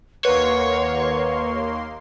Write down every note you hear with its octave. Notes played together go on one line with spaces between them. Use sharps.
D#2 A#3 B4 C#5 F#5 C6